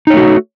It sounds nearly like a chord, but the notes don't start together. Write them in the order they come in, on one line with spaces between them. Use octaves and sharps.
D#4 C#5 A3 F#4